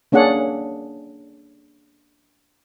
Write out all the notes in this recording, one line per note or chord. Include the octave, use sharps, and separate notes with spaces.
A#3 C#4 D4 G#4 F#5